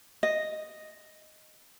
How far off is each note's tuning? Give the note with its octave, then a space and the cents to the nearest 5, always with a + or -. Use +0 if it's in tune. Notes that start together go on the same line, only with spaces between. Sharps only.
D#5 -5